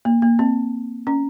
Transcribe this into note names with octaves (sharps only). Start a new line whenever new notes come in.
A#3
A#3
C4
C#4